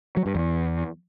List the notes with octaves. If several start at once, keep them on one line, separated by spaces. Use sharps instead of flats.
F#3
G2
E2